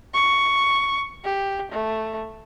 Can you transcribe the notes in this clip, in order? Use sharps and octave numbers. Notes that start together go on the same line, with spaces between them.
C#6
G4
A3